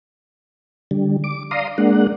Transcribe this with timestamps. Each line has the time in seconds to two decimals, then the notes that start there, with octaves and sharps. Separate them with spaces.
0.91 D3 G3
1.24 D6
1.51 D5 F5 A#5 C6 D#6
1.78 G#3 A#3 D4 F#5